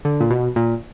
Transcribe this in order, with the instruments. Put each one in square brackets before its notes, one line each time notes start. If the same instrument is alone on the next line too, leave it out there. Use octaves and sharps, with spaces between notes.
[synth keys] D3
A#2
B2
A#2